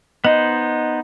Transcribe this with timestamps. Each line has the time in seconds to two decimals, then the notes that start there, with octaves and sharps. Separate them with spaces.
0.25 B3 D#4 C5 D#5